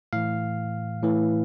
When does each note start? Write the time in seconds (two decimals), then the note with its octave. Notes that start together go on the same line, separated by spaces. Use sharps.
0.13 A2 E3 F5
1.03 A2 E3